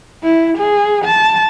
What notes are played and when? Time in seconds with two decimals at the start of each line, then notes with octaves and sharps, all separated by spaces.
0.23 E4
0.58 G#4
1.04 A5